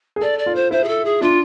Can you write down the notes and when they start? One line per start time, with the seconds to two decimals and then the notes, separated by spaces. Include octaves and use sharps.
0.16 G#4
0.21 A4 D5
0.38 D5
0.46 F4
0.55 C5
0.71 E4 C5
0.84 G#4
0.88 A4
1.05 G#4
1.21 D4 F4